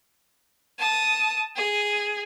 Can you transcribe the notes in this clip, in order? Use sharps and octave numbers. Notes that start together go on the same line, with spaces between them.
A5 D#6
G#4